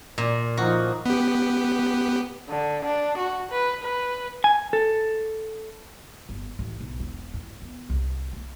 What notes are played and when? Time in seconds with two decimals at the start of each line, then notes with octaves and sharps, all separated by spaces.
0.18 A#2
0.57 F3 D#4 F#4
1.06 B3 G4
2.48 D3
2.85 D4
3.17 F#4
3.51 B4
3.83 B4
4.44 G#5
4.73 A4
6.29 G1
6.59 A1
6.81 B1
7.00 E1
7.34 A2
7.62 B3
7.90 C2
8.33 A#3